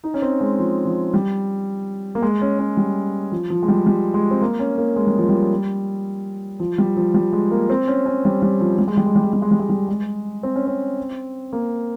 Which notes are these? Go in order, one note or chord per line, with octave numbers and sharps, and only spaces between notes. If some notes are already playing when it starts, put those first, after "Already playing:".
D#4
C#4
C4
G#3
F3
F3
G3
A#3
G#3
C#4
C#4
G3
F3
F3
G#3
G3
G3
G#3
C4
A#3
C#4
A#3
G#3
G3
F3
G3
F3
G3
F3
G3
G#3
A#3
C4
C#4
C#4
G3
G3
F3
G3
G#3
G3
G#3
G3
G#3
G3
G#3
G3
G#3
G3
G#3
C4
C#4
C4
A#3